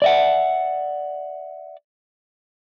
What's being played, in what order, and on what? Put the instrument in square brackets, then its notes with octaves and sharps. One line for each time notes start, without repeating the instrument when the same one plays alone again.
[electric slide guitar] D5 E5 F#5